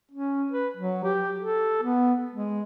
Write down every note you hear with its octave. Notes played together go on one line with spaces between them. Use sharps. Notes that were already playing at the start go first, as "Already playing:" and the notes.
C#4
B4
F#3
G4
A4
B3
G#3